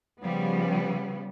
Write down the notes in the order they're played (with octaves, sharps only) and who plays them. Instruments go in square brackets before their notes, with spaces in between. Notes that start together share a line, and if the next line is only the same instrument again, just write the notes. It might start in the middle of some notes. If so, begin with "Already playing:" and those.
[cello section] C#3 F3 G3 B3